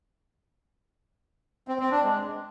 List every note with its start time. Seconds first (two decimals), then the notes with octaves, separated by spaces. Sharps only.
1.68 C4
1.80 C4
1.91 D4
2.03 G#3